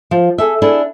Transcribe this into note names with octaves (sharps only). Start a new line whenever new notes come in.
F3
G#4 A4 E5
D4 E4 G#4 A4